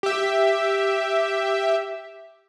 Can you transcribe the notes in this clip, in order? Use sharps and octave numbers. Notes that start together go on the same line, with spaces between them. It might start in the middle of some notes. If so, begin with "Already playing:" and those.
G4 E5